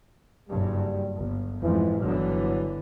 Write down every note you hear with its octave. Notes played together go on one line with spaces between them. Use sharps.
F#1 G2 G3
G1
F2 G#2 E3
G1 D3 E3 F#3